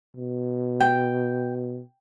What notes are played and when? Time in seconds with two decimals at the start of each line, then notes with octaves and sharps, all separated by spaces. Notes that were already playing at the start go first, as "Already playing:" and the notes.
0.17 B2
0.80 G5